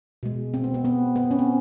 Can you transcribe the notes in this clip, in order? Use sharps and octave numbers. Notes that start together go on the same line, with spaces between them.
B2 G#3
C4
B3
B3
B3
B3
C#4
C4